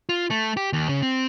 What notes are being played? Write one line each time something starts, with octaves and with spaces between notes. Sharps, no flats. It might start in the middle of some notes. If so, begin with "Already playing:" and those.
F4
A3
G4
D#2
C#3
C4